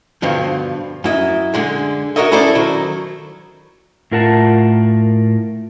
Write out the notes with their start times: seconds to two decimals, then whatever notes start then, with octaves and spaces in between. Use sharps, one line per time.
0.22 G2 B2 D3 F3
1.04 F#2 E4 D#5
1.54 D3 G#3 G#4
2.16 F#4 A4 A#4 C#5 D#5 E5
2.31 C#4 E4 G#4 A4 C5 D5
2.55 D#3 F#3
4.11 A2 F4 A#4 F#5 A5